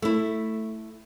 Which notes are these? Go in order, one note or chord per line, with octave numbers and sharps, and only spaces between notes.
A3 E4